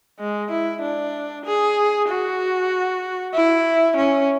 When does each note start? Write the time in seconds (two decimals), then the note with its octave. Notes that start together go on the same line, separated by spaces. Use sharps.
0.19 G#3
0.50 E4
0.82 D4
1.45 G#4
2.08 F#4
3.34 E4
3.96 C#4